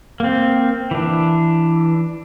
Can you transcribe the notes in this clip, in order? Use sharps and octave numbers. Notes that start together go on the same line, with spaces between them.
A#3 C4
E3 D4